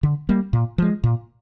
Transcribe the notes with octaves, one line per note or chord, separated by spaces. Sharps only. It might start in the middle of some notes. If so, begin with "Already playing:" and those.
D3
G3 A#3
A#2
F3 G#3
A#2